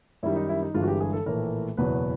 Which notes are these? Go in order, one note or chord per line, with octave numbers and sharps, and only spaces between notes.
F#2 D#3 G3 E4
D#4
E4
D#4
G1 G2 E3 G#3 F4
F#4
G4
G#4
A4
A#1 A2 E3 A3 A#4
F#1 E2 B2 F#3 B4